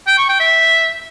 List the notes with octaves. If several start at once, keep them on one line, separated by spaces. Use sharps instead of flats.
G5
C#6
G5
E5